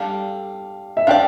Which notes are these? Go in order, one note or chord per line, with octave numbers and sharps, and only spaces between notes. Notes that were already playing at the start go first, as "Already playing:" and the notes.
Already playing: G3 D4 A4 F5
E5
D4 G4 D5 F5